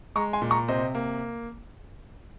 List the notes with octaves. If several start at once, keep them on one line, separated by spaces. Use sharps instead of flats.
G#3 A#5 C#6
G#5 C6
A#2
A#5 C#6
C3 C5 D#5
A#3